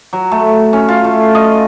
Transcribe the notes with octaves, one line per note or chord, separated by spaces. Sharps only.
F#3
A3
C#4
F4
A3
D#5